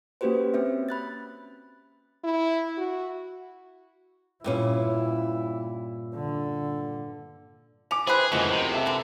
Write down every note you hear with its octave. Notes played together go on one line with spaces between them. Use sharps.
A#3 C#4 F#4 G4 B4 C5
C4 C#4 E5
B5 F#6 A6
E4
F#4
G2 A#2 C#4 E4
D3
C#4 D6 F7
E4 G4 G#4 B4 C5
F#1 C#2 A2 E3 C#4 F#4 D#5
C3
A4 E5
B2 D3